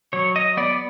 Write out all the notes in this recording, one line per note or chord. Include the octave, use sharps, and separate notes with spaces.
F#3 C#5
D#5
B3 D5